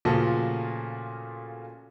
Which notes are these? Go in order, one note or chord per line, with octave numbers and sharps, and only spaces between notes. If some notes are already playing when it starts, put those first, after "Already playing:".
A#2 C#3 F3 A3 F#4 A4